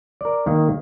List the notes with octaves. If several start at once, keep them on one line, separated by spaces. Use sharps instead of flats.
A#4 D5
D#3 A#3